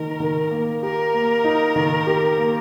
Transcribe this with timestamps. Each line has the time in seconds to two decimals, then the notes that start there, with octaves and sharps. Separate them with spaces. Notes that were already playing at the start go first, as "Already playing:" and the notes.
Already playing: D#3 D#4 A#4
0.20 D#3
0.51 A#3
0.82 G4 A#4
1.14 A#3
1.44 D#4
1.76 D#3
2.07 G4
2.37 A#3